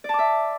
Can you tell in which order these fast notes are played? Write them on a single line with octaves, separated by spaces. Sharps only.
D5 A5 D6 E5